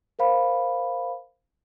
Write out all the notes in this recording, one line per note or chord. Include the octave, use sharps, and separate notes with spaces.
A#4 C5 F5 B5